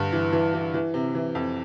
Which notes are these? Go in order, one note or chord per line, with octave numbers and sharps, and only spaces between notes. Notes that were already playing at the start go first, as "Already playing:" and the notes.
Already playing: G2 D3
E3
E3
E3
E3
C3
E3
F2